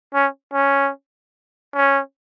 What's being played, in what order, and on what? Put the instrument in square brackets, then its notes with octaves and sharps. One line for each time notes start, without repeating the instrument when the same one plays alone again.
[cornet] C#4
C#4
C#4